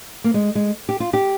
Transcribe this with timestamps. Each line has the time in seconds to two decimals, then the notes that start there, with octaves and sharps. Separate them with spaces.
0.24 A#3
0.34 G#3
0.55 G#3
0.89 G4
1.00 F4
1.13 G4